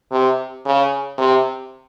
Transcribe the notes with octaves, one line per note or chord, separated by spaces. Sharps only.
C3
C#3
C3